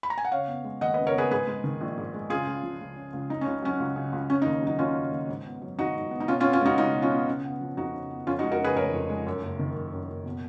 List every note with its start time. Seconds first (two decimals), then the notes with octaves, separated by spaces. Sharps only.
0.03 B5
0.10 A#5
0.18 G#5
0.25 F#5
0.32 C#3 C#5 F5
0.48 B3
0.64 G#3
0.81 D#2 D#5 F#5
0.94 B4 D#5
0.98 C#3
1.07 A#4 C#5
1.14 B3 G#4 B4
1.31 G#2 G#4 B4
1.47 G#3
1.64 D#3
1.81 A#1
1.98 G#2
2.14 G#3
2.30 C#3 F4 G#4
2.47 C#2
2.63 F3
2.80 C#2
2.96 C#3
3.13 C#2
3.29 C#3 D#4
3.41 C#2 C#4
3.62 F#3 C#4
3.80 C#2
3.96 C#3
4.13 C#2
4.30 C#3 C#4
4.42 D#4
4.46 D#2
4.62 F#3 D#4
4.79 D#2 C#4 F4
4.95 C#3
5.12 D#2
5.29 G#2
5.45 B3
5.62 F#3
5.78 G#1 D#4 F#4
5.95 G#2
6.11 B3
6.20 D#4
6.28 B2 C#4 F4
6.40 C#4 F4
6.45 B3
6.53 C#4 F4
6.61 G#3 D#4 F#4
6.78 C#2 D#4
6.94 B2
7.02 C#4 F4
7.11 B3
7.28 C#3
7.44 B3
7.61 F3
7.77 F2 D#4 F#4
7.93 C#3
8.11 B3
8.27 F2 C#4 F4
8.39 D#4 F#4
8.43 G#3
8.51 F#4 A#4
8.60 C#3 G#4 B4
8.76 F1 A#4 C#5
8.93 F2
9.10 G#3
9.26 F#2
9.42 F#1
9.59 D#3
9.76 F#1
9.92 F#2
10.09 F#1
10.26 B2